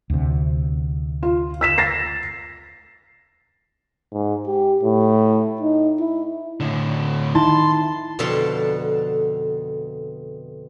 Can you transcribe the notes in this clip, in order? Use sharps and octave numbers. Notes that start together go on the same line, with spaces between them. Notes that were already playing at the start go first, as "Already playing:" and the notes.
D2 C3
F4
E6 B6 E7
A6 A#6 C7
G#2
G4
A2
D#4
E4
A2 D3
D#3 D#4 E4 A5 C6 A6
F2 B2 D3 A4 F5 A5